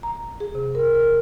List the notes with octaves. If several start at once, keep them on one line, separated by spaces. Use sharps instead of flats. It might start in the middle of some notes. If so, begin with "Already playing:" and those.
A#5
G#4
C3
A#4
A#4